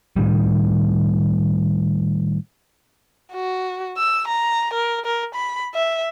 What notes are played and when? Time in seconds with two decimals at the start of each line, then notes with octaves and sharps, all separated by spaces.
0.16 A2 D#3 G3
3.33 F#4
3.97 E6
4.28 A#5
4.73 A#4
5.05 A#4
5.34 B5
5.74 E5